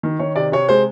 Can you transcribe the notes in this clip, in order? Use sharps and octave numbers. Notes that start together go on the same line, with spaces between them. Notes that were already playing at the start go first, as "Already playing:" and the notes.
D#3
D#3 C#5
C3 D5
C3 C#5
G#3 C5